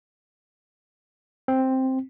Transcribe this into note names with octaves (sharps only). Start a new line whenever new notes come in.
C4